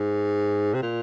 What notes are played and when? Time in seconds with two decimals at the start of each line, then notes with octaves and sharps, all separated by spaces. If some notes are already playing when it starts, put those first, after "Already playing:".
Already playing: G#2
0.74 C3
0.82 A#2